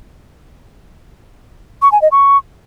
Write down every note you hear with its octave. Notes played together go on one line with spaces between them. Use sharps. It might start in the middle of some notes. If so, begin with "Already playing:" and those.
C#6
G#5
D#5
C#6